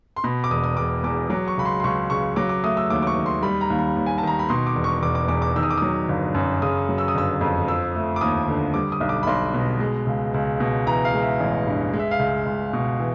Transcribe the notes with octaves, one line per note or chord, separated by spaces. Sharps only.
C6
B2 B5
D6
E1 D#6
D#6
E1 D6
E2 D6
F#3 D6
C#6
C#2 B5
C6
C6
C#2 C#6
C#3 C#6
F#3 D6
D6
A3 D#6
E6
D#2 D6
D6
C#6
D#3
C6
G3 B5
A#5
D#2
B5
D#2
G#5
A5
D#3 A#5
B5
B2 C6
D6
E1
C#6
E1 D6
D6
E2 D6
D6
D#3 E6
D#6
D6
F#3 D#6
G1
F#2
C#3 D#6
F#3
E6
D#6
G1 E6
F2
F3 E6
A3
D6
D#2 D#6
D3
G3 D6
D#6
B1
D6
B5
B1 C6
B2
G#3
C#2
C#2
B2
E3 A#5
F5
G#3
E5
A1
G2
G#3
E5
F5
C#2
C#2
B2
E3